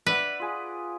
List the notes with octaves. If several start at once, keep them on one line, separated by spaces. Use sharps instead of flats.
B4 D5 E5 F#5
F4 G#4